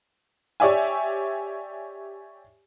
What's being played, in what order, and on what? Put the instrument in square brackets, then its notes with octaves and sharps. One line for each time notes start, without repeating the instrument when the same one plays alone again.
[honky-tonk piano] G4 C#5 D5 E5 G#5